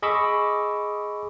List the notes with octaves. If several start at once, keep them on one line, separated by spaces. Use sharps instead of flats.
G#4 D#5 B5 C#6 D6 E6